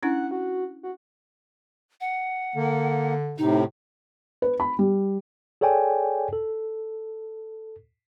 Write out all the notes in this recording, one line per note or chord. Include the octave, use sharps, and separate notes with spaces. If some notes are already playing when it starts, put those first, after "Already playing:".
C#4 D4 E4 F#5
F#4
F#4
F#5
D3 A#3
A2 C3 D#4
B4
B5
G3
G#4 A4 C#5 D5 G5 G#5
A4